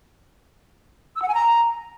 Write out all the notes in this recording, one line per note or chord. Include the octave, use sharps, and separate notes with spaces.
E6
F#5
G#5
A#5